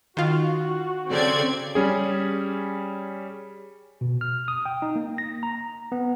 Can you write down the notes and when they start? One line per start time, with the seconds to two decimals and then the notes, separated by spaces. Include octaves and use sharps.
0.17 D#3 F4 F#4
1.10 C#3 C4 A4 D5 G5 G#6
1.75 G3 C#4 G#4
4.01 B2
4.21 F6
4.48 D#6
4.66 G5
4.82 D#4
4.96 A#3
5.18 A#6
5.43 A#5
5.92 B3